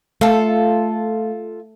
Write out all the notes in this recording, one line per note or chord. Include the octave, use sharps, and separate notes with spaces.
A3 F4 A4